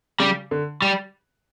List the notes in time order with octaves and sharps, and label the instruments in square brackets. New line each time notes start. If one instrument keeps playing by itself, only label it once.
[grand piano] C#3 [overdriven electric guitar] G3
[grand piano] D3
[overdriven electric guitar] G3